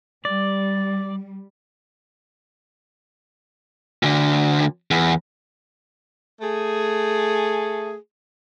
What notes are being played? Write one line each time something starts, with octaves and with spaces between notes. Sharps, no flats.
G3 D5
D2 D3
E2
A3 G#4